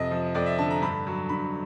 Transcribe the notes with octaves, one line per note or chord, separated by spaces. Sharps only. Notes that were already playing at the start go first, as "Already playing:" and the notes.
Already playing: F2 C3 D#5
F3
F2 D5
E5
D3 A5
A#5
G2 B5
F#3
G2 B5